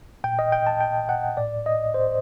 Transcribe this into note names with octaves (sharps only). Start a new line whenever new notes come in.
A#2 G5
D#5
G5
A5
G5
F#5
A2 D5
D#5
C5